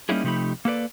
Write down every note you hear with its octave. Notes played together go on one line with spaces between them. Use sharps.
G3 A#3 C#4 D#4 E4 G#4
C3 F3 A3 D#4 G4 B5
A#3 A4 B4 D5